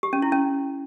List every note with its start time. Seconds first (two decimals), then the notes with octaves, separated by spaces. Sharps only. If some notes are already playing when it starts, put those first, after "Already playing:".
0.03 G4
0.13 C#4
0.22 E4
0.32 C#4